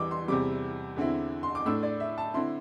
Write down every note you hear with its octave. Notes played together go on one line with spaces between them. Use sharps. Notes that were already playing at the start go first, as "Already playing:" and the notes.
Already playing: E2 E3 G3 D6 E6
C6
E2 C3 G3 D6
E2 D3 C4 E4
C6
D6
A2 A3 D4 E6
D5
E5
A5
D3 C4 E4 C6